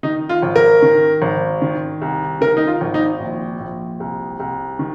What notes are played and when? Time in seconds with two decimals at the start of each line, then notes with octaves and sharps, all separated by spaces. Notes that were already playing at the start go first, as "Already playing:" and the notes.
0.03 D#3 D#4
0.29 F4
0.43 G#1
0.56 A#4
0.82 D#3
1.22 G#1
1.62 D#3
2.01 C2
2.41 D#3 A#4
2.57 D#4
2.67 F4
2.81 G#1
2.94 D#4
3.20 A#1
3.60 A#1
4.00 C2
4.40 C2
4.79 D#3